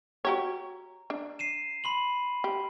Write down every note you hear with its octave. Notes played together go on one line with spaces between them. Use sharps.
F#4 G4 C#5 A#5
D4
C7 D#7 E7
B5 C6 F#7
G4